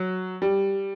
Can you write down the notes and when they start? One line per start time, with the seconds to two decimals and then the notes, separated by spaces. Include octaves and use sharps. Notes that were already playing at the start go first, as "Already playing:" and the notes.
Already playing: F#3
0.42 G3